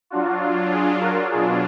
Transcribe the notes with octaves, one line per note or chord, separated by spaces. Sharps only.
F#3 D4 F4 F#4
G#4
F#4 A#4
B2 F#3 D4 F4 G#4